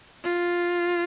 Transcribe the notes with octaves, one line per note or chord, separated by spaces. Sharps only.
F4